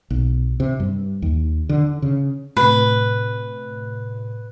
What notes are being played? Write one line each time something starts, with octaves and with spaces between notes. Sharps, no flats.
B1
C3
G2
D#2
D3
C#3
A2 C3 B4